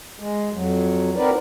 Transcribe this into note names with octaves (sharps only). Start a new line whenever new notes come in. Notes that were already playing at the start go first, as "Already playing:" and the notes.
G#3
F2 F#3
B3 C4 D#4 A#4 B4 D5